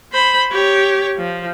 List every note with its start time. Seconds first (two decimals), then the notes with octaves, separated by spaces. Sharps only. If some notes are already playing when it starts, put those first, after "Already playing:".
0.12 C5 B5
0.51 G4 C#5
1.17 F3